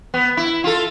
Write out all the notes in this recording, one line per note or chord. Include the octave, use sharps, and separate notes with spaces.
B3
E4
F4 A4